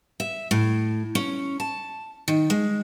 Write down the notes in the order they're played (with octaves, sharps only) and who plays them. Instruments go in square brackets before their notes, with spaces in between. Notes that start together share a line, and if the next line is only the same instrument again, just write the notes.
[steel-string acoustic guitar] E5
A2
C#4
A5
D#3
G#3